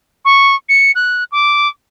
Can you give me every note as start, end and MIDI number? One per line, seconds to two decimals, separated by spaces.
0.25 0.55 85
0.69 0.92 97
0.95 1.24 90
1.32 1.69 86